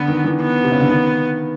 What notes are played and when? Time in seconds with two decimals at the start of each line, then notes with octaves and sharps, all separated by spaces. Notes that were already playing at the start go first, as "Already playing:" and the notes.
Already playing: D3 B3
0.08 D#3
0.25 E3
0.41 B3
0.64 C3
0.72 C#3
0.80 D3
0.89 D#3